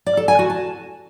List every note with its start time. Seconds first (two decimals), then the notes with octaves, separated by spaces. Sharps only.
0.06 D5
0.17 A4
0.28 G#5
0.39 F#4
0.50 A5